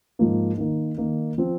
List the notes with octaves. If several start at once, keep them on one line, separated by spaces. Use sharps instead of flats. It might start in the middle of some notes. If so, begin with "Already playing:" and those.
G#2 F3 A#3 D#4
D#3 A#3 D#4
D#3 A#3 D#4
F3 C4